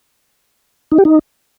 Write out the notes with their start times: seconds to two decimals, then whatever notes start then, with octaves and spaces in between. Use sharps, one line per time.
0.92 D#4
0.98 G4
1.05 D#4